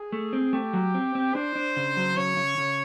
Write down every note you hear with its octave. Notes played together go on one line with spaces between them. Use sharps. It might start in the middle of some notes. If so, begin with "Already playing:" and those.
Already playing: G#4
A3
C4
A3 G4
F#3
C4
C4
D4 C5
D4
C#3
F#3
C#3 C#5
C#3
C#3